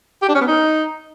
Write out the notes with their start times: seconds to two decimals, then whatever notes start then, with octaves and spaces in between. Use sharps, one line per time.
0.22 G4
0.28 D4
0.35 C#4
0.41 B3
0.47 D#4